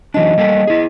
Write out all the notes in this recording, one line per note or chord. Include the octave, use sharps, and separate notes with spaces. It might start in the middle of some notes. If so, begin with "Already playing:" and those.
E3 F#3 D4 D#5
G3 A#3 A4
E4 G#4